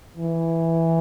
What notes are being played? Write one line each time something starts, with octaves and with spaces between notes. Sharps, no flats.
E3